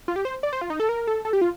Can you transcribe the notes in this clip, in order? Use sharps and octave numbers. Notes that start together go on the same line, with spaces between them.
F4
G4
C5
D5
C5
F4
D#4
A4
A#4
A4
A4
G4
F4